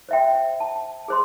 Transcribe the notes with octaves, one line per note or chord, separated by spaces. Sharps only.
C5 E5 G5
A5
G#4 C5 C6